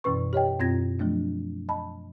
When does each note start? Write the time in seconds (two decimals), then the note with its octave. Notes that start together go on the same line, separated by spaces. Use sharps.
0.04 F#2 B2 E3 C#4 B4 C#6
0.33 G4 C#5 D#5 G5
0.59 F#2 B2 C4 F4 G#6 A#6
0.99 F3 F#3 A3 D4
1.69 D#5 A5 B5